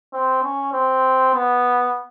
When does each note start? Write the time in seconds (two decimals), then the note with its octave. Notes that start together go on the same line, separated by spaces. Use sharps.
0.13 C4
0.43 C#4
0.73 C4
1.34 B3